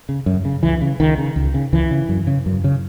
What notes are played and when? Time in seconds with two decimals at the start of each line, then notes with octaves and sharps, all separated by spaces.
0.09 C#3
0.26 F#2
0.45 C#3
0.63 C#2 E3
0.81 C#3
1.00 C#2 D#3
1.18 C#3
1.36 C#2
1.54 C#3
1.73 C#2 E3
1.91 C#3
2.09 F#2
2.27 C#3
2.46 F#2
2.64 C#3